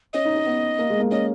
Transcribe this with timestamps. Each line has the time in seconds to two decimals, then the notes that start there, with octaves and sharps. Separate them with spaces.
0.13 C#4 D#5
0.25 D#4
0.36 C#4
0.46 B3
0.79 A#3
0.90 G#3
1.00 A#3
1.11 C#4 D#5